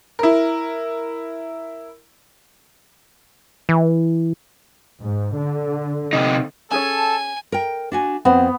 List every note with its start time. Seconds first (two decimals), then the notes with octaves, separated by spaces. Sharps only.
0.19 E4 A#4
3.69 E3
5.01 G#2
5.36 D3
6.13 C3 D#4
6.71 C#4 G#4 A4 C#5 G#5 A5
7.52 A#4 G5
7.92 D4 F#4 G#5
8.25 F2 B3 C4